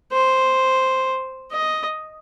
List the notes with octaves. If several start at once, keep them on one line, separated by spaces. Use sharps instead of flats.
C5
D#5